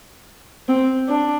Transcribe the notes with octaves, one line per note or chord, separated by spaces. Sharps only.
C4
D4